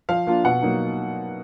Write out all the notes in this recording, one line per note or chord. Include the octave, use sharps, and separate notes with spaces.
F3 F5
A#3 D4 F4
B2 F#5
F#3 A#3 D#4